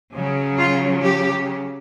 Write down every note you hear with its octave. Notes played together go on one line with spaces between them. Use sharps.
C#3 F#3
F4
G4